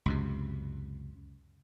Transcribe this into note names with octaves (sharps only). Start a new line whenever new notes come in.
C#2 F#2 C3